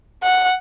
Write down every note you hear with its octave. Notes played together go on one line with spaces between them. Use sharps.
F#5